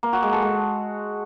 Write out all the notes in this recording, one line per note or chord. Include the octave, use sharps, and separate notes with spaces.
A#3
F#4
G#3
A4
G#3